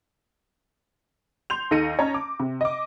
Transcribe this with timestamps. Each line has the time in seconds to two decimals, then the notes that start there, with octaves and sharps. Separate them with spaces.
1.50 C6 G6 F7
1.71 D#2 D#4 A4 A#6 C#7 D#7
1.99 C#4 C#5 D#5 A5 A#5
2.14 D6
2.40 C3
2.61 D#5 D6